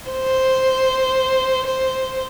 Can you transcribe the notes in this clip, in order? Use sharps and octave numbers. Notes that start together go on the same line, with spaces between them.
C5
C5